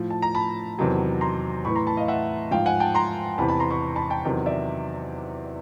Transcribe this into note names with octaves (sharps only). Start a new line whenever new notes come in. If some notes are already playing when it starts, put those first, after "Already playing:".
Already playing: A2 F3
A5
A#5
A5 B5
E2 C3 D#3 F#3
A#5 C6
A2 E3 B5 C#6
A#5 C6
A5 B5
D#5 F5
E5 F#5
G#2 F3 F5 G5
F#5 G#5
G5 A5
A#5 C6
E2 C3 E3 A5 B5
A5 B5
A#5 C6
B5 C#6
A5 B5
G5 A5
E2 C3 D#3 F#3
D5 E5